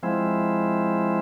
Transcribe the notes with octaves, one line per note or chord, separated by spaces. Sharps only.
F3 G#3 C4 E4